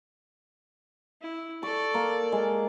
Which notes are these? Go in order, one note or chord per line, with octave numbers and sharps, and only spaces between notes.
E4
A4 D5 C#6
A#3
G#3